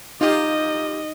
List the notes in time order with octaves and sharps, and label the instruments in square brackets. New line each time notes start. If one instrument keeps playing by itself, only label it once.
[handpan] D#4 [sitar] F4 G4 [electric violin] D#5